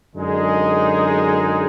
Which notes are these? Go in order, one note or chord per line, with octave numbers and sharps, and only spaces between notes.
F#2 D3 G#3 D#4 G#4